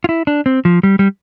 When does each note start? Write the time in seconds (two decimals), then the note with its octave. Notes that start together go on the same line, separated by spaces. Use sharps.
0.04 F4
0.09 E4
0.27 D4
0.46 C4
0.65 F3
0.83 G3
0.99 G3